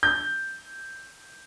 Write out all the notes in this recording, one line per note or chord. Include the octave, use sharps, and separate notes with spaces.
G6